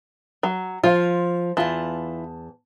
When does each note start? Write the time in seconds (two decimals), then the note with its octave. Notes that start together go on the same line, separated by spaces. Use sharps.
0.43 F#3
0.83 F3 F4
1.57 E2 E3 F4 A5